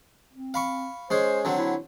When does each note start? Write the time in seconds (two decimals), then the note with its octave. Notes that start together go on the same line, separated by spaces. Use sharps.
0.33 C4
0.54 F5 B5 C#6
1.11 G#3 C#4 G#4 C5
1.45 D3 F#3 C4
1.57 E4